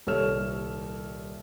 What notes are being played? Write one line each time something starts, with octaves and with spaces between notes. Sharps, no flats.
D#1 C2 A4 C#5 F6 E7